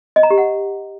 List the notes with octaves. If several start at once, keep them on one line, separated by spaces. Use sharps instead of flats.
D#5
A#5
G4
F#5